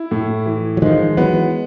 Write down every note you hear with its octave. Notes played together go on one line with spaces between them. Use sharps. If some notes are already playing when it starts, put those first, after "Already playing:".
Already playing: E4
A2
E3
F#3
D#3 F3 G#3
E3 F#3 B3